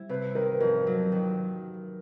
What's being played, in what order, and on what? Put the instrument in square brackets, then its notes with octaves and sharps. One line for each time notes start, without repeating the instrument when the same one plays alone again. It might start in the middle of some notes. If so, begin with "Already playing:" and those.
Already playing: [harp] G3 C4 E4
[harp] C3 [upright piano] B4
[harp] D#3 [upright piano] A#4
[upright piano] B4
[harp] F2 [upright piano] A#4
[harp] F#3
D#3